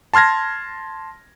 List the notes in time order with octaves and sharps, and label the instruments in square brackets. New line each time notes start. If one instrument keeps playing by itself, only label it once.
[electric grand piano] A5 C6 F6 G#6 A#6